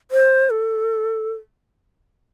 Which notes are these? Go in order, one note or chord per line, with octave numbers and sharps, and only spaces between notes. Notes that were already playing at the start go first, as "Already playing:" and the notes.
C5
A4